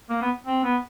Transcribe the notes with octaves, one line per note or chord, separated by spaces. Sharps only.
A#3
B3
C4
B3